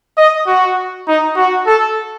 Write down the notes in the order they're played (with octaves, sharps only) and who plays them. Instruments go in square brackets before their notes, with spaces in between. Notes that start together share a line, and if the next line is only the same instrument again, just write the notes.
[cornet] D#5
F#4
D#4
F#4
A4